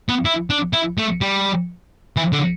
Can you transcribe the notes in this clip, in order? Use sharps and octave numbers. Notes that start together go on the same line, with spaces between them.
B3
E4
D4
E4
A3
G3
E3
D3